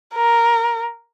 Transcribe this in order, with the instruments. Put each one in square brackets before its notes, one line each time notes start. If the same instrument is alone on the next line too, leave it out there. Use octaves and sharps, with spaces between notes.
[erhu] A#4